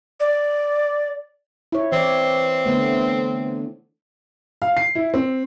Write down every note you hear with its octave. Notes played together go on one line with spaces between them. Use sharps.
D5
E4 C#5
E3 C4 D5
D3 A3 B3
F5
C7
E4
C4